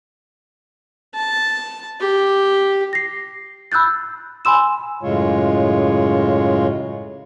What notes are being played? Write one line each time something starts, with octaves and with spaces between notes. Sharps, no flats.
A5
G4
A#6 C7
B5 E6 F#6 G6 A6
G#5 B5 C6 E6 E7
F#2 A2 C#3 G#3 F4 C#5